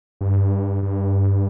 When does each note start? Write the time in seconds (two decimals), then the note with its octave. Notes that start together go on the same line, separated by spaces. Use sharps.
0.21 G2
0.83 G2